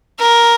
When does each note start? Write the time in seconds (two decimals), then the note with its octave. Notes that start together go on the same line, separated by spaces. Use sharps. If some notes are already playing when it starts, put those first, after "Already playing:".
0.19 A#4